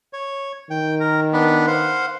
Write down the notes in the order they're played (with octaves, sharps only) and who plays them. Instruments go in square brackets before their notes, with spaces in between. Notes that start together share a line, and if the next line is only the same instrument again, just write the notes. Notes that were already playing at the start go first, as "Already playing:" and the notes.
[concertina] C#5
[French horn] D#3 [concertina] G5
[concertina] A#4
B3 D4 B4
C5 F5 F#5